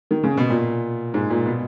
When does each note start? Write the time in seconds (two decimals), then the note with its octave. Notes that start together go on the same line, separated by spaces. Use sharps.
0.11 D#3
0.23 C#3
0.37 B2
0.50 A#2
1.14 G#2
1.30 A#2
1.46 B2